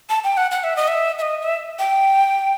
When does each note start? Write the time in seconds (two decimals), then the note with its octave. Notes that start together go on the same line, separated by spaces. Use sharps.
0.09 A5
0.24 G5
0.37 F#5
0.51 F#5
0.64 E5
0.77 D#5
0.88 E5
1.19 E5
1.22 D#5
1.42 E5
1.79 G5